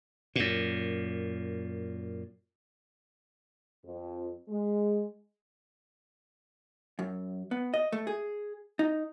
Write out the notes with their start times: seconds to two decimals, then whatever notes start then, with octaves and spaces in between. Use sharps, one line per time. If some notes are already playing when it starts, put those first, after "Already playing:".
0.36 F#2 A#2
3.85 F2
4.49 G#3
6.99 F#2
7.51 B3
7.74 D#5
7.92 A3
8.07 G#4
8.79 D#4